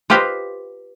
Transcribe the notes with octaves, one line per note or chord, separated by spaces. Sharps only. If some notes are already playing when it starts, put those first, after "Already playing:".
F4 G4 B4 C5 D#5 F5